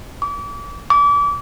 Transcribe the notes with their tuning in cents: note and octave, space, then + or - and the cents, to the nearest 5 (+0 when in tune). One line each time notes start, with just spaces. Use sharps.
D6 -35
D6 -30